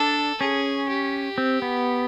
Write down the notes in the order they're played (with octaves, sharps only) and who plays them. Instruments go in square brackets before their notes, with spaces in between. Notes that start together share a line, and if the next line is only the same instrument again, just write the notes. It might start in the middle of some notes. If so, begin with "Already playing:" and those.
Already playing: [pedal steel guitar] D4 [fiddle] A4
[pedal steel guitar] C#4 [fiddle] G#4
[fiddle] G4
[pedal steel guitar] C4
B3